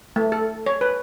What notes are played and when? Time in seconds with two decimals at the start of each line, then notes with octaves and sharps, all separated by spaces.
0.16 A3
0.32 A4
0.66 C#5
0.81 B4